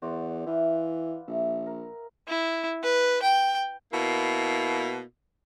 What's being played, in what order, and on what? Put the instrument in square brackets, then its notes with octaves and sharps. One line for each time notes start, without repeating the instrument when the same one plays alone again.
[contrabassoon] E2 [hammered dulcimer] F#4 C5 D5
[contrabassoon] E3 [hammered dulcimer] E4 B4 F5
[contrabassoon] A#1 [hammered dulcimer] E5
[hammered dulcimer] A#4
[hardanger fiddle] E4
B4
G5
[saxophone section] B2 A#3 E4